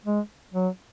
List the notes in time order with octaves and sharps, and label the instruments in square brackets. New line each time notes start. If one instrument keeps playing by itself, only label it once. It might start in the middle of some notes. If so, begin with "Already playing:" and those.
[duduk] G#3
F#3